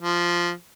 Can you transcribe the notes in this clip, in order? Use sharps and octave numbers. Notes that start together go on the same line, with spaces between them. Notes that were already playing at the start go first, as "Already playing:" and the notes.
F3